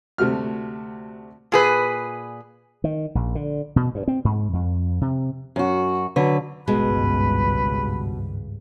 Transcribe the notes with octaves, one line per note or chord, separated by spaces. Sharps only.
D2 C3 A3 F#4 F6
A#2 G#4 B4
D#3
A#1
D3
B2
G2
C4
G#2
F2
C3
F#2 F#4
D3 F#3 B4
G#1 C#2 G2 B2 G#3 B4